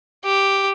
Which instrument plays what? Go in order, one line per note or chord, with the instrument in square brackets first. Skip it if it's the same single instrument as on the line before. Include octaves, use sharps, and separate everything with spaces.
[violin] G4